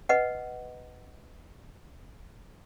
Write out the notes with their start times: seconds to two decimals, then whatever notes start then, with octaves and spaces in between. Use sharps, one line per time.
0.09 B4 D#5 F#5